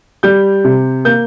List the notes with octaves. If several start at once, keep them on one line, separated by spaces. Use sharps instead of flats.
G3 G6
C3
A#3 G6